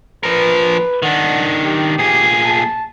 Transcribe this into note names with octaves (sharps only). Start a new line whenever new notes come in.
F3 A#4 B4
D#3 D4 F#5
G4
A#2 G#4
A5